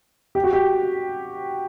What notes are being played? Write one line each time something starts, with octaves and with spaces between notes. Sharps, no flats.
G4
F#4
G4